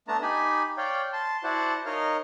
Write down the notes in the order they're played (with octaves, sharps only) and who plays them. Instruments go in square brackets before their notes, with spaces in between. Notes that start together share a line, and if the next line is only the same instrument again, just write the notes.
[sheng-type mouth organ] A3 B3 D4 A5 A#5
D#4 G4 G#5 B5
C#5 D5 F5 G5
A5 C6
E4 F#4 C5 D5 F#5 A5
D#4 A#4 C#5 D#5 F5 F6